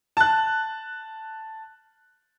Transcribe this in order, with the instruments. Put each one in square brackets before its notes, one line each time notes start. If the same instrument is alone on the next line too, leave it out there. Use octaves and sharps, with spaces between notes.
[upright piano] A5 F#6